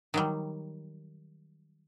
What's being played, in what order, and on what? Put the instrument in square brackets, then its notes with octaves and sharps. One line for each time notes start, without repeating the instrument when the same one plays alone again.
[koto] D#3 F#3 G3